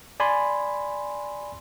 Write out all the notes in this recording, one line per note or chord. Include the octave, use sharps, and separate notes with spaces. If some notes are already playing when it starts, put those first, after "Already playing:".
D5 G#5 B5 C6